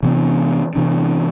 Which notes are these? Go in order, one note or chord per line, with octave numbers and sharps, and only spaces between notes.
C3 E3 B3 D4
C3 E3 B3 D4